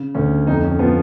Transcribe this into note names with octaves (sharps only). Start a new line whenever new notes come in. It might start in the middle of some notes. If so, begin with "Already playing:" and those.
Already playing: C#3
D2 C#4
F2 D#4
C#4
F3 B3